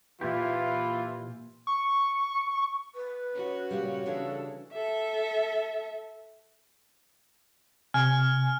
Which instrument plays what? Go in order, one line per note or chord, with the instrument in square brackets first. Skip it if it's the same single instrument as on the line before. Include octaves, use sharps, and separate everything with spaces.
[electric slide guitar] A#2 E4 G4 [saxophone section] E3 [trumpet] F4
[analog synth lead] C#6
[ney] B4
[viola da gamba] C#4 F#4 C#5
[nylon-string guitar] A#2 C#3 G3
[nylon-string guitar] C#3 E3 D4 [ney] A4
[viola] A4 E5
[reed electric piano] C3 [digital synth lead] G#5 [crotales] F6